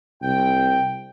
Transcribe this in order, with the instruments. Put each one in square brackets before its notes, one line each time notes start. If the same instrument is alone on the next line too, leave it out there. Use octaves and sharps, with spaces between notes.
[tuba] C2 [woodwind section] G5